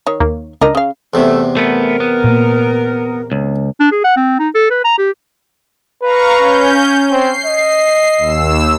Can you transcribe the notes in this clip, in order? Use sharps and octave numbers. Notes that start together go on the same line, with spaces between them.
D#3 C#5
D#2 A#3
C#2 D4 A#4 D#5
C#3 F5
E2 C3 A3
A3 B3 A#4
B3
A#2 A#3
C#2
D4
G#4
F#5
C4
D#4
A4
B4
A#5
G4
B4 F5 A#5 C#6
C#4 G6
C4 C7
D#5
D#2 E6